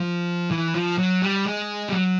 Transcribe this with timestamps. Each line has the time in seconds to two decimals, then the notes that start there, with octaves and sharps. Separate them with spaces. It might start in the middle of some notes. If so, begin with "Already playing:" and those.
Already playing: F3
0.51 E3
0.74 F3
0.98 F#3
1.22 G3
1.46 G#3
1.89 G3
1.93 F#3